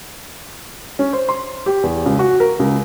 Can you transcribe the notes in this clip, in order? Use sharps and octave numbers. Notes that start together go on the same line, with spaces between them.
C#4
C5
C6
G4
E2
C#2
F#4
A#4
C#2